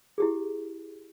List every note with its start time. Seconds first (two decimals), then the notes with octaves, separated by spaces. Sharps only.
0.18 E4 G4 G#4